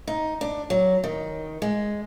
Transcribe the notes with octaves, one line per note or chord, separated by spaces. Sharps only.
D#4
D4
F#3
D#3
G#3